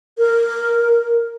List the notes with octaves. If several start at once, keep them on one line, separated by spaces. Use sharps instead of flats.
A#4